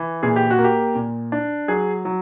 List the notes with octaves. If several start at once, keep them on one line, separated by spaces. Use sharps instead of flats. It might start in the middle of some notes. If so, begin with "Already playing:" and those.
Already playing: E3
A#2 G#4
G4
F#4
A#3
G4
A#2
D4
F#3 G#4
F#3